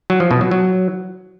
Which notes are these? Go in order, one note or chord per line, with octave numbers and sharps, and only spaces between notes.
F#3
F3
B2
F#3
F#3